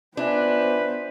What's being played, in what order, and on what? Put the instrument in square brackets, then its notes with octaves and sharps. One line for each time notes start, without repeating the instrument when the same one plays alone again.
[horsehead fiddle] B3 C5 [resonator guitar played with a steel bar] D4 [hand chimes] F4 E5 G#5 [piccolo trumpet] B4